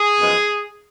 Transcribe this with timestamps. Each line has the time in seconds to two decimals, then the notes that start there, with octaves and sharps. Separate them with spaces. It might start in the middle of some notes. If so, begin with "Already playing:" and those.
Already playing: G#4
0.20 F#2 F3 G#3 B3